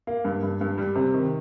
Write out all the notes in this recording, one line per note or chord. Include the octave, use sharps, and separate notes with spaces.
A#3
G2
G2
G2
G3
C3
D#3